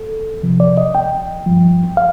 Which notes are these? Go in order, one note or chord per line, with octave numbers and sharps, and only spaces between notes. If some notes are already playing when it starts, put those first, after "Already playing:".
Already playing: A4
F2 C3 F3
D5
D#5
G5
G2 F3
F5